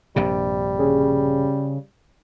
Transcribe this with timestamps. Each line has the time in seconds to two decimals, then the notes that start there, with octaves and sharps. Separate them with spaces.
0.16 A#1 G2 C3 G3
0.78 C#3